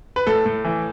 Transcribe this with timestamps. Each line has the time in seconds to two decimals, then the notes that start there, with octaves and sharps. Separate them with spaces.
0.16 B4
0.27 A2 A4
0.46 A2
0.65 E3